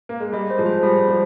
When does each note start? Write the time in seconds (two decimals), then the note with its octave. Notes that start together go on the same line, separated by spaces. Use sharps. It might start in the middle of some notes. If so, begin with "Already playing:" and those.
0.09 A#3
0.20 G#3
0.32 G3 D#5
0.50 C5
0.58 F3 G#3
0.66 C5
0.83 G3 G#4
1.01 C5
1.08 F3 G#3